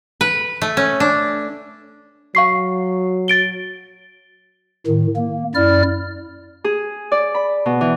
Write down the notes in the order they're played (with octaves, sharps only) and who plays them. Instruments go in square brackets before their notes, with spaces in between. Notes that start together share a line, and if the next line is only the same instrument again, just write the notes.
[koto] B4
A3
C#4
D4
[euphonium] F#3 [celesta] F5 C#6 C7
[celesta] A6 D7 G7
[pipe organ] A2 D#3
A#3
F#2 E4 D5 F6
[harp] G#4
D5
B5
B2
E3